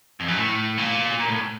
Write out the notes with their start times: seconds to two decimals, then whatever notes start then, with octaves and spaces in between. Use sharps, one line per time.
0.20 F2
0.28 F#2
0.37 A2
0.78 A#2
1.19 A#2
1.29 A2